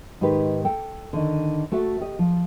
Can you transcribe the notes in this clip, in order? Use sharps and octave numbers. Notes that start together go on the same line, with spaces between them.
G#2 D#3 G4 B4
A4 G5
D3 D#3
A3 F#4 A4 E5
G4 D#5
F3